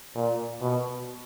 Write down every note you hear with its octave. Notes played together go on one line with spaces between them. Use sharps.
A#2
B2